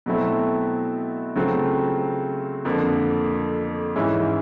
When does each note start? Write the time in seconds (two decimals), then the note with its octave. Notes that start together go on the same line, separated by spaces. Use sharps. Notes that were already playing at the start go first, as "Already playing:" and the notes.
0.06 B2 F#3 A3 C4 E4
1.35 C#3 F#3 A3 C4 F4
2.65 F2 D3 F3 A#3
3.95 G#2 E3 G#3 C#4 E4